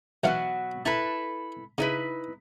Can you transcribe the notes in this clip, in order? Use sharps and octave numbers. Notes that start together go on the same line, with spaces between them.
B1 B2 E3 F#3 F5 F#5
E4 A4 B4 A5 A#5
C#3 D#4 E4 B4